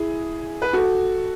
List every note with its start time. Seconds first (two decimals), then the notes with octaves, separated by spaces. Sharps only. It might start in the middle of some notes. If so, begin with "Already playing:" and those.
Already playing: E4 G#4
0.62 B4
0.73 F#4 A4